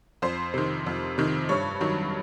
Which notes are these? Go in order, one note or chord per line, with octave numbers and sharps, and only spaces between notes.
F2 C5
C3 D#3
F2
C3 D#3
G2 C#5
D#3 F#3